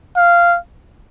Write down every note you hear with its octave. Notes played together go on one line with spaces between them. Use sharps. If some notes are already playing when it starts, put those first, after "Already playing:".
F5